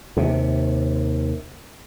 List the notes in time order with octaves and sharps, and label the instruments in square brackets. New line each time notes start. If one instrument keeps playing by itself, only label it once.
[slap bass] D#2 C3